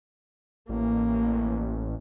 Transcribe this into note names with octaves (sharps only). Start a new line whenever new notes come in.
A1 A#3